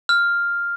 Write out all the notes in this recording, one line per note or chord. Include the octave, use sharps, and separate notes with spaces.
F6